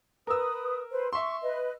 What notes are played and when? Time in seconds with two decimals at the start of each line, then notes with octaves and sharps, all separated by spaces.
0.27 A#4 B4 D#6 E6
0.90 B4 C5
1.13 E5 C6 C#6
1.42 B4 D#5